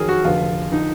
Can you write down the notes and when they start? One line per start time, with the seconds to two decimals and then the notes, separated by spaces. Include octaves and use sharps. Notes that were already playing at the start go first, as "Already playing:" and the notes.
Already playing: F2 D#3 F#3 G#4 A#4
0.09 F#4
0.24 F1 F2 D3 F4
0.72 D3 F3 D#4